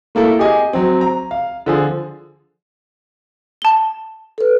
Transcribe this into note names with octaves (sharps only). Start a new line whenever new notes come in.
A3 A#3 E4 A4
G4 G#4 D#5 G#5
F#3 C4
A#5
F5
D3 F3 G#4
A5 G7
A4 B4